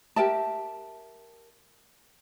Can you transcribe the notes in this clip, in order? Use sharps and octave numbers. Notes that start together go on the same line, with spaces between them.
G4 A#4 E5 A5